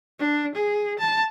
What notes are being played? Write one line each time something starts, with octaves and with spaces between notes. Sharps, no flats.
D4
G#4
A5